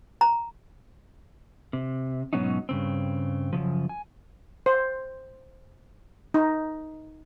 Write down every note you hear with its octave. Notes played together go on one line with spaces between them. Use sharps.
A#5
C3
G#2 B2 F#3 B3 C#4 D#4
G2 C#3 C4
F#2 A#2 C#3 F3
G#5
C5
D#4